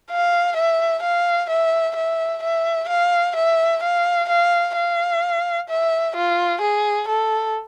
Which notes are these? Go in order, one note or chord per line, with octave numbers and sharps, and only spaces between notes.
F5
E5
F5
E5
E5
E5
F5
E5
F5
F5
F5
E5
F4
G#4
A4